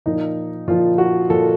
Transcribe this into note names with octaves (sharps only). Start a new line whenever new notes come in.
A#2 F3 D#4
A#2 F3 F4
F#4
A#2 F3 A4